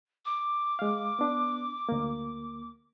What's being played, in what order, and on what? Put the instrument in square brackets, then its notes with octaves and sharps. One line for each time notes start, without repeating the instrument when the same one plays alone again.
[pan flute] D6
[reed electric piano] G#3 F5
B3 D4
D2 A#3